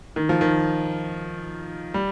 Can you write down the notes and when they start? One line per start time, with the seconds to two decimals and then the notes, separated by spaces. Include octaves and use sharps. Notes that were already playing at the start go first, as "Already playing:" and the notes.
0.16 D#3
0.29 F3
0.41 D#3
1.94 G3